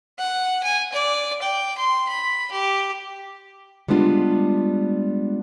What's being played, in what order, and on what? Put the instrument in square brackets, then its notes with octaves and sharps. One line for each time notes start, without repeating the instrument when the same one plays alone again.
[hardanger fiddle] F#5
G#5
D5
G5
C6
B5
G4
[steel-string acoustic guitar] G3 G#3 B3 D4 F4